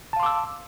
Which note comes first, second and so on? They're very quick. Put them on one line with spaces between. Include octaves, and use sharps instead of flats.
A5 F5 C6 D6 E6